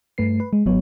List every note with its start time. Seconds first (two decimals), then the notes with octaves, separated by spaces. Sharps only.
0.18 G2 A3 B4 C7
0.40 B4
0.53 G#3
0.66 G#1 F#3 B3 C#5